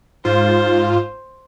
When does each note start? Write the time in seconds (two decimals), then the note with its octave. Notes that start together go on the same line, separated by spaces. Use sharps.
0.25 G#2 F4 C5